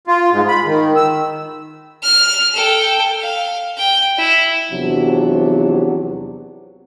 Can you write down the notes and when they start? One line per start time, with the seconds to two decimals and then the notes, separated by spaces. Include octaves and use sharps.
0.07 F4
0.31 G#2
0.48 B5
0.65 D#3
0.96 E6
2.03 F6
2.54 A4 G5
3.21 F5
3.78 G5
4.18 E4
4.72 E2 C3 F3 F#3 D4